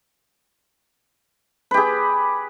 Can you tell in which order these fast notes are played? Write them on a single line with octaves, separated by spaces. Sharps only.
B4 G4 G#4